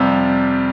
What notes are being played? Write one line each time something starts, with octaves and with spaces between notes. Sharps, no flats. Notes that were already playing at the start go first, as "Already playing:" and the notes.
Already playing: F2 C3 G3